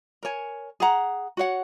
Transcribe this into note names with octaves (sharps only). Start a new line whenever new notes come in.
A#4 C#5 G#5
G#4 F#5 A#5
F#4 C#5 F#5